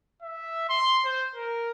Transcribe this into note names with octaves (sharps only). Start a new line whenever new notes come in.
E5
C6
C5
A#4